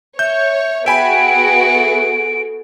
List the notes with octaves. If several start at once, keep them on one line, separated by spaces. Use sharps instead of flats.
C#5 E5 G6
B3 F#4 G#4 E5 G5 G#5 B5 D7
A4